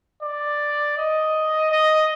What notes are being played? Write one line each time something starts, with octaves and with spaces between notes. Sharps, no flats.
D5
D#5
D#5